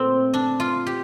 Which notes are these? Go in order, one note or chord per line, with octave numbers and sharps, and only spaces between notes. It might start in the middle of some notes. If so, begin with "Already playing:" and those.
Already playing: A#2 A3 C4
D4
F4
G4